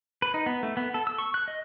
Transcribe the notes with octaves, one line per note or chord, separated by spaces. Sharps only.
B4
D#4
B3
A3
B3
A4
E6
C#6
F#6
D#5